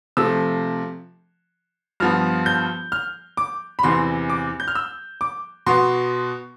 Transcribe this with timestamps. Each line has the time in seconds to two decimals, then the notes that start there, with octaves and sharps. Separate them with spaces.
0.17 C3 F3 A3 E6
2.00 G2 F3 B3 F6
2.46 G6
2.92 F6
3.37 D6
3.79 B5
3.83 E2 C3 E3 C6
4.30 D6
4.60 G6
4.68 F6
4.75 E6
5.21 D6
5.66 B2 B3 C6